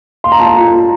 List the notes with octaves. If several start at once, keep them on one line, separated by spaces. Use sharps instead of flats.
F5 C6
A#5
F4 A5
A#5
F4
F4